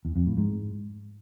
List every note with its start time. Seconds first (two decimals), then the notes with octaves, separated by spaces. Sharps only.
0.05 E2
0.16 F2
0.26 A2
0.37 G#2